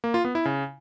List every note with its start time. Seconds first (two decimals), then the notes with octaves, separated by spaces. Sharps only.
0.04 A#3
0.14 F4
0.25 B3
0.35 E4
0.45 C#3